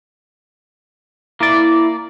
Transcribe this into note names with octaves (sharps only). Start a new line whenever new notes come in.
A#3 E4 D5